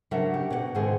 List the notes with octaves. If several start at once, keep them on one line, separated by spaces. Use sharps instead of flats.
C#3 F#3 D4 A#4 E5 F#5
G4
B2 D5 F#5
G#2 B2 D3 D#3 C4 G#4